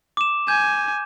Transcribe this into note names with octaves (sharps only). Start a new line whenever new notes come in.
D6 E7
G#5 G6